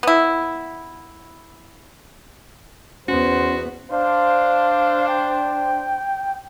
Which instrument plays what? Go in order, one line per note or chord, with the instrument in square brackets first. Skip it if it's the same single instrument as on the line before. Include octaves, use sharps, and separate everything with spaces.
[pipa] B3 E4
[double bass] E2 B3 [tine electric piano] C#4 [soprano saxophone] F#4 [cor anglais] C5
[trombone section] D4 C5 [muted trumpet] F5
[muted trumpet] G5